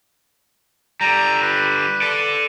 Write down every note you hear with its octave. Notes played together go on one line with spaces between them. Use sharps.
D3 G3 A#5
B4
A4 D5